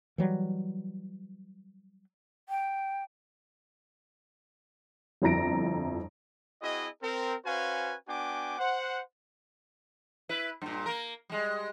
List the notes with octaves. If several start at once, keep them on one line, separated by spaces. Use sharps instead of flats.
E3 F#3 G3
G5
G1 F2 E4 A#5 A#6 D7
C4 E4 F#4 G#4 D#5
C4 A#4
C#4 F#4 B4 C5 F5 G#5
B3 D4 F#4 G5 G#5 D6
C5 F#5
E4 B4
G2 A#2
A#3 A#4
G3 G#3